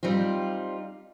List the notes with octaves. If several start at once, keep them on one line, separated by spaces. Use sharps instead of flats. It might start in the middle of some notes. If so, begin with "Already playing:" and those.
G3 C4 D#4 F4